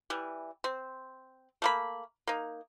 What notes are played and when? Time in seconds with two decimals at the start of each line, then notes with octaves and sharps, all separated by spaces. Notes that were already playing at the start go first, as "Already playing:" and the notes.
0.10 E3 G3
0.64 C4
1.62 A3 A#3 B5
2.27 A#3 D#4